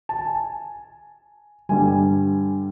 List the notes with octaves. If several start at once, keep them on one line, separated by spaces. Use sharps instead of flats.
A5
G#5
G2 D3 G3 G#5